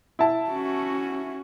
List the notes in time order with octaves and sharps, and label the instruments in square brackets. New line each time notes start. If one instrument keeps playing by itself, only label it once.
[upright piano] E4 A5
[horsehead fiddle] C#4 F#4